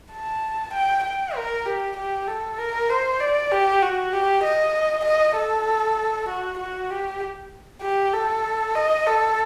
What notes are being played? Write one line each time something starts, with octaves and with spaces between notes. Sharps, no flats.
A5
G5
G5
A#4
G4
G4
A4
A#4
C5
D5
G4
F#4
G4
D#5
D#5
A4
F#4
F#4
G4
G4
A4
D#5
A4